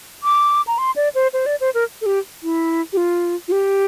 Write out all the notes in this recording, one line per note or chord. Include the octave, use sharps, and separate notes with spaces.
D6
A#5
C6
D5
C5
C5
D5
C5
A#4
A4
G4
E4
G4
F4
F4
G4